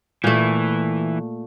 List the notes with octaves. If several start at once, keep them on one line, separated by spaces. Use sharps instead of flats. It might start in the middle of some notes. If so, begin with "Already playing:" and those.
A#2 E3 A3